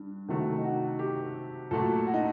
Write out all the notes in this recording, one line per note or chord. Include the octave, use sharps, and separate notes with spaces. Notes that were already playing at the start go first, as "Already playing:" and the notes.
Already playing: G2
C3 D#3 F#3 A3
D#4
F#4
G4
A#2 F#3 A3 A4
F#4
D#4